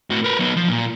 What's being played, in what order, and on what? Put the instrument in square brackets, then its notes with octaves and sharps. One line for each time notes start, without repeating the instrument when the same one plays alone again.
[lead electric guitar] A2 F#4
A#4 B4
F#3 B3
F3
A#2